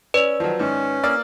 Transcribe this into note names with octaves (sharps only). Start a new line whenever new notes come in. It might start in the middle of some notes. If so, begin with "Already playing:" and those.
C#4 B4 D5 F7
D#3 F3 F#3
G#2 D#3 C#4
A#3 D5 E6 F6